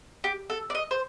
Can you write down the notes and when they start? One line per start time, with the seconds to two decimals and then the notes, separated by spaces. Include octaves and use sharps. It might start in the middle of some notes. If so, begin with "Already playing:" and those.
0.24 G4
0.50 A4
0.70 D5
0.75 D#5
0.91 C5